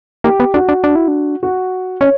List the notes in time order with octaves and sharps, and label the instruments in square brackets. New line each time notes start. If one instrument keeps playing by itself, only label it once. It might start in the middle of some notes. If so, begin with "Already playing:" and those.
[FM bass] A#3 [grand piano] G4
[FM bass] B3
[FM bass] D4 [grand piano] F#4
[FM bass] D4
D4
E4
D4
[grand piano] F#4
[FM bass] C#4 [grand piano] C#5